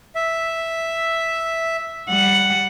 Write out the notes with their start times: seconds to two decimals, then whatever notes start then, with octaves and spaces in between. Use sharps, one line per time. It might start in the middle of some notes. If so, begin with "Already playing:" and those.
0.15 E5
2.09 G3 F#5